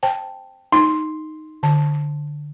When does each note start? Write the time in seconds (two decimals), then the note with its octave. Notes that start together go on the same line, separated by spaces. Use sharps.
0.03 C5 G5 A5
0.72 D#4 C6
1.63 D3 A5